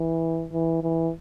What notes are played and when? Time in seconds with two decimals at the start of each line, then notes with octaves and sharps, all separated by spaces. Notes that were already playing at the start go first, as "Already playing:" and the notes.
Already playing: E3
0.52 E3
0.83 E3